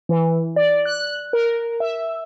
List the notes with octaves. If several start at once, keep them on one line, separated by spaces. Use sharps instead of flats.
E3
D5
F#6
A#4
E5